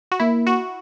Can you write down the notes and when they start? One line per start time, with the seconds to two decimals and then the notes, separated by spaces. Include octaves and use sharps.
0.12 F#4
0.20 A#3 E4
0.47 F#4